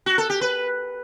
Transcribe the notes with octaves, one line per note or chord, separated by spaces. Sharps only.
F#4
A4
G4
B4